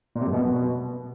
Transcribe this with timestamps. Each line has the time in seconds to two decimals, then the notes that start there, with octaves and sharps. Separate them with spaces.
0.15 A#2
0.21 C3
0.27 F#2
0.33 B2